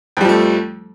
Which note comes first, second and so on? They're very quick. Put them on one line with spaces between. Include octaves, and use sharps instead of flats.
F2 G3 F3 A3